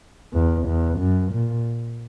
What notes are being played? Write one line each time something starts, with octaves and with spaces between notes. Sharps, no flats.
E2
E2
F#2
A#2